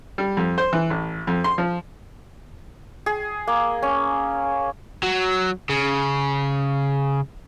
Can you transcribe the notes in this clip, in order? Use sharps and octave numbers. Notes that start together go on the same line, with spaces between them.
G3
F2
C5
E3
A1
F2
C6
F3
G#4
A#3
C#4
F#3
C#3